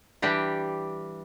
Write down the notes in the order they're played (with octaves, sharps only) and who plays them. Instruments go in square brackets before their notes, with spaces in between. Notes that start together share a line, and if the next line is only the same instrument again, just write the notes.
[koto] E3 G3 D4 G4